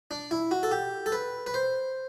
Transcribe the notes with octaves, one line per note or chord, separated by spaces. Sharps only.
D4
E4
F#4
A4
G4
A4
B4
B4
C5